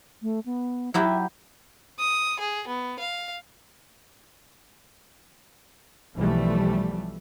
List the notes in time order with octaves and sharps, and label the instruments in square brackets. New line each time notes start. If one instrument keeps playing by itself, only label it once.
[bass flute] A3
B3
[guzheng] F#3 E4 G4 [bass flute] E5
[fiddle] D#6
G#4
B3
F5
[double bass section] B1 E3 F3 G3 A3